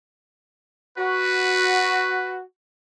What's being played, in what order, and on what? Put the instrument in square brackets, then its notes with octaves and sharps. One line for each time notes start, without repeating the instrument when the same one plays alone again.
[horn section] F#4 [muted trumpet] B4